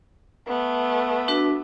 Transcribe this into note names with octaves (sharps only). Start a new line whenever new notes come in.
A3 B3
D4 F#4 B4